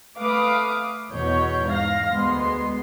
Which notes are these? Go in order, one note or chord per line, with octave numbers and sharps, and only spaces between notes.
A3 B4 F5 D6 D#6
E2 B2 C#5 G6
G#2 F5 A#6
D2 G#3 B3 C6